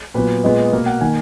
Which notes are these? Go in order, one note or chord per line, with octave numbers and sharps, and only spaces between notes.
A#2 F#3 B3 B4
A#2 G#3 B3 D#5
B2 A#3
F#5
D#3 A#3 G#5